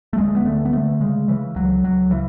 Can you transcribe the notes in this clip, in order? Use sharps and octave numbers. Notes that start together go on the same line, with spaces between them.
A3
D2 G#3
B3
D3 A3
B3
D3 A3
C#3 G#3
C#3 E3
C#2 F#3
C#2 F#3
C#3 E3